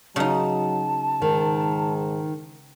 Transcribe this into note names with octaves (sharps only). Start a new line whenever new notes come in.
C#3 F#3 D#4 A5
G#2 D#3